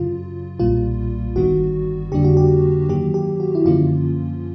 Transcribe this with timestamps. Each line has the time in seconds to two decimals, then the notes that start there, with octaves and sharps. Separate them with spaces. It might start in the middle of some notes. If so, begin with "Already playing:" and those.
Already playing: F#2 C#3 F#3 F4
0.59 B1 A#2 G3 A#3 F4
1.36 G1 G2 D#3 G3 B3 F#4
2.12 F2 D3 G3 A#3 D4 G4
2.24 F#4
2.37 G4
2.89 G2 D#3 F#3 A#3 G4
3.14 G4
3.40 F#4
3.55 E4
3.65 F#2 D3 F3 A#3 C#4 F4